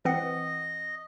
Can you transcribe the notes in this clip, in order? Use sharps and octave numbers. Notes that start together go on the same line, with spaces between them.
E3 C4 D#5 F#5